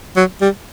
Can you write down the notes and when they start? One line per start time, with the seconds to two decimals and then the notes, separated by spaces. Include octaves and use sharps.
0.16 F#3
0.41 G3